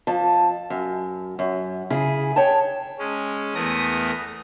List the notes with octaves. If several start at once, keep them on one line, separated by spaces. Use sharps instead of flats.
F2 A5
F#2
F#2
C#3 E4 G#4
C#5 G5 A5
G#3 C#4
E2 A3 B3 A#4 D#6 A#6